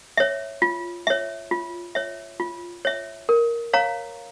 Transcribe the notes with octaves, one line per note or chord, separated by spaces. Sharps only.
C#5 E5
F4
C#5 E5
F4
C#5 E5
F4
C#5 E5
A#4
C#5 F5 A#5